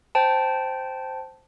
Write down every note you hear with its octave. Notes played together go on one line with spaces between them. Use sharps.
C5 G5 A5